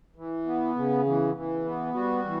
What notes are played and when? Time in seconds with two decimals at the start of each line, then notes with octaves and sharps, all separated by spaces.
0.16 E3
0.46 B3
0.75 C#3
1.06 E3
1.35 E3
1.65 B3
1.94 G3 F#4
2.25 E3